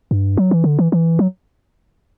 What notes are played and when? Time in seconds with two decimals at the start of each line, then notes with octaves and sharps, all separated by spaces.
0.11 G2
0.37 F#3
0.51 E3
0.64 D3
0.79 E3
0.92 E3
1.19 F#3